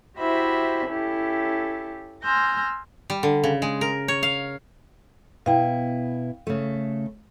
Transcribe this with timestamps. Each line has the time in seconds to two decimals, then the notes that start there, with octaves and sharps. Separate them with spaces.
0.18 E4 F#4 G4 C5 E5 B5
0.86 C#4 E4 G4 A4
2.22 G#5 C6 E6 F6 G6 A#6
3.10 G3
3.23 D3
3.44 C#3
3.62 G#3
3.81 A#4
4.08 C#5
4.23 F5
5.46 B2 E4 F5 G5
6.47 C#3 A3